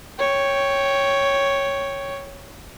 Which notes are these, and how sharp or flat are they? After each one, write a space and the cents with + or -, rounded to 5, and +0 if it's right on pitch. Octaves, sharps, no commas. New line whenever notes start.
C#5 +0 G5 +0